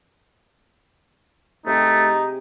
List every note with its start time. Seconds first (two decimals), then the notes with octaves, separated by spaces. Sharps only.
1.66 C3 A3 D#4 G#4 G5